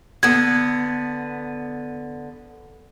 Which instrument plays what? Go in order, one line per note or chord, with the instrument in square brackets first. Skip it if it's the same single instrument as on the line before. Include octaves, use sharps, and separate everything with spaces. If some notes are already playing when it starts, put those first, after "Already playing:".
[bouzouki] D3 B3 [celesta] G#6